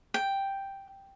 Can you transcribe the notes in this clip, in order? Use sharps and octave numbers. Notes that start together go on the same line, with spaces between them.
G5